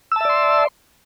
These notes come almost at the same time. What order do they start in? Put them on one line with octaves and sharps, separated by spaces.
E6 A5 E5 D5 C6